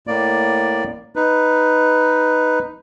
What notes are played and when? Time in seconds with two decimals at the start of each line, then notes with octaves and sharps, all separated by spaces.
0.07 A2 A#3 D5
1.16 D#4 B4